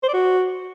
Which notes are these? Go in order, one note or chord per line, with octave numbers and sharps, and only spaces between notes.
C5
D5
F#4